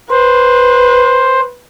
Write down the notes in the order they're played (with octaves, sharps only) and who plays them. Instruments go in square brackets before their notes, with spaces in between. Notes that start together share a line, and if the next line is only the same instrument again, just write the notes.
[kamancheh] B4 [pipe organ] C5